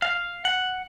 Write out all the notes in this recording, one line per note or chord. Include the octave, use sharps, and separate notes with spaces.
F5
F#5